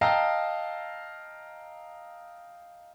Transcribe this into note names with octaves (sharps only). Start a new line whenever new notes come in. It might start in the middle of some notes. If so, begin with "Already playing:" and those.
D#5 F5 G5 A5 A#5 E6